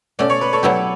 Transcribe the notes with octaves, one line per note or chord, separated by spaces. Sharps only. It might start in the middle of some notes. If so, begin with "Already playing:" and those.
B2 A3 C#4 D5
C#5
B4
A4 C#5
B2 F#3 B3 E4 G4